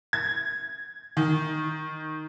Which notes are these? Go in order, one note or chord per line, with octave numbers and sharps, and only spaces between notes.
G#6
D#3